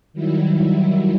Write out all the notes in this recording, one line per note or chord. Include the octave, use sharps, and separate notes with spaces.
D#3 F#3 G3 E4